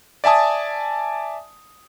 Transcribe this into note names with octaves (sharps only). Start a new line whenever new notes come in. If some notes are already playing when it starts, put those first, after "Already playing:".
D5 E5 G#5 A5 D#6